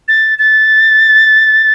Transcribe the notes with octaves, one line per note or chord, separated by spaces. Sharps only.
A6
A6